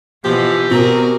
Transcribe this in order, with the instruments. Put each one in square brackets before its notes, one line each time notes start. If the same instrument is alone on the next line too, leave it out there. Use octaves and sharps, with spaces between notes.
[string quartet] B2 E3 [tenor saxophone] F3 [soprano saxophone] G4
[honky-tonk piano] B2 [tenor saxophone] C4 [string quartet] A#4 G#5 A#5